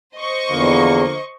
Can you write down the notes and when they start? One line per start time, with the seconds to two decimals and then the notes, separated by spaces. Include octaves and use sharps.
0.17 C5 D#5 C#6
0.51 E2 D3 F3 A#3